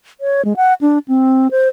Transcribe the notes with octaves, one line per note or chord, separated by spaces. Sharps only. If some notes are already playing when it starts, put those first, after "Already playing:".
C#5
G#3
F#5
D4
C4
C5